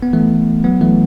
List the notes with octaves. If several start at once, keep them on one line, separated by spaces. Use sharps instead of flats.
B3
E3 A3
F#3 B3
E3 A3